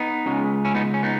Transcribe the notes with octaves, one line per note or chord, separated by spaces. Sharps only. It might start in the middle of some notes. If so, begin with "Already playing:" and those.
Already playing: B3 D#4
C#2 C#3 G#3
C#4 E4
B3 D#4
C#4
B3 D#4